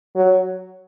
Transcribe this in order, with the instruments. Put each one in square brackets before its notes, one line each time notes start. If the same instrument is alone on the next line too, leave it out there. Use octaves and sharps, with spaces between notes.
[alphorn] F#3